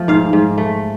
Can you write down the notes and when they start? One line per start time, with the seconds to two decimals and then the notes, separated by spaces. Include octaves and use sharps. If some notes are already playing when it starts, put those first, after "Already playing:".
Already playing: F3 A3
0.08 G#2 F5
0.33 G#2
0.58 A3